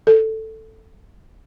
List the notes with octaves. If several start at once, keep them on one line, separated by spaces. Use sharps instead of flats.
A4